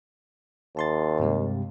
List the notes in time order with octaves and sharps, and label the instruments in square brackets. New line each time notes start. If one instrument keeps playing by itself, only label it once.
[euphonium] D#2 [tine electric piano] A5 C6 A6
[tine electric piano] G2 C3 G#3